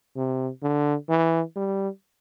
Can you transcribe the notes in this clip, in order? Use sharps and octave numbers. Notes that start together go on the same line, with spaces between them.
C3
D3
E3
G3